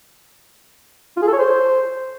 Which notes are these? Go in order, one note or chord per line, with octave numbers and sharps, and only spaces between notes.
F4
G#4
A4
C#5
C5